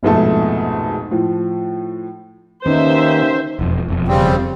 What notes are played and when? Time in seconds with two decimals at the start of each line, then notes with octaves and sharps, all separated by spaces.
0.03 A#1 F2 G#2 B2 A3 A5
1.11 A2 F3
2.66 D#2 D#3 C#4 D#4 B4 C5 E5
3.59 E1 F2
3.88 E1 F2
4.08 C#3 G3 C4